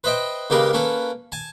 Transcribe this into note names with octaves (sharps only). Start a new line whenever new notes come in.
B4 C5 D#5 E5 G5
C#3 G#3 A#3 G4 A#4 B4
A#3 C#4 A4 B4
G#5 A5